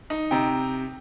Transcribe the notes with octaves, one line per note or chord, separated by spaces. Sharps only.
D#4
C3 G5 A#5